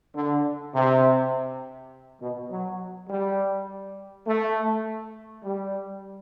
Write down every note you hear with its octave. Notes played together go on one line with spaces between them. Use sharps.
D3
C3
B2
F#3
G3
A3
G3